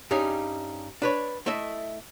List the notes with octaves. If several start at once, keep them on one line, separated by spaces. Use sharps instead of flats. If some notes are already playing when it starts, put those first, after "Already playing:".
G2 G3 C#4 D#4 G#4
D4 B4 C#5
A3 E4 A4 D#5 E5